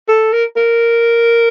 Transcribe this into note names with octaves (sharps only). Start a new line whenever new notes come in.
A4
A#4
A#4